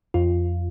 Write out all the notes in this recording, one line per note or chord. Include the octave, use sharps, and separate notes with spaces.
F2 F4